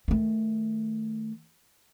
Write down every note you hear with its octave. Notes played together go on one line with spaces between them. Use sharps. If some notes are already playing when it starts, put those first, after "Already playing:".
D#3 A3